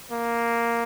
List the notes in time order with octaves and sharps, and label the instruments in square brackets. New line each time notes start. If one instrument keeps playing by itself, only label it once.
[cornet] A#3